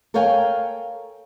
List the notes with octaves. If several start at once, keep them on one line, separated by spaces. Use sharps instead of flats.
A4 A#4 C#5 F5 G5 G#5